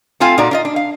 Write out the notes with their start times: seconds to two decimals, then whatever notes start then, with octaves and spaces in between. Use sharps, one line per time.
0.20 A3 C4 F4 F5 G#5
0.38 A#2 D#4 F#4 D5
0.51 D4 F4 D#5
0.65 D4
0.76 F5